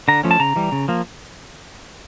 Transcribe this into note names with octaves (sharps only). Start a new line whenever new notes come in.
D3 A#5
F3 A3 C#4
A5
C#3 A#5
E3 G3
C#3
F3 A#3